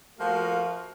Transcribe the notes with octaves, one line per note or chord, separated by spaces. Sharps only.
F3 A3 A#3 F4 F#4